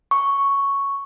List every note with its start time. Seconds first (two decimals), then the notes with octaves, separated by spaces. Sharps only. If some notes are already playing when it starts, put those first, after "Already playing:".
0.11 C#6